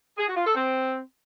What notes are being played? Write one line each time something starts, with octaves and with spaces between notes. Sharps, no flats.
G#4
F#4
F4
A4
C4